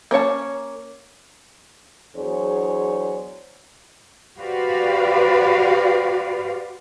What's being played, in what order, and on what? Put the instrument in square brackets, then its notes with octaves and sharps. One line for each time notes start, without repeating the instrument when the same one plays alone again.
[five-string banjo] A#3 C#4 C#5 A5
[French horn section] E2 F#3 D4 G#4 C5 C#5
[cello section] F#4 G4 B4 C5 D5 F5